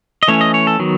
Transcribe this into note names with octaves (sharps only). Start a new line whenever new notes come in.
D#5
E3 A3 C#4 C#5
D#5
C#5
A4
D#3 F#3 B3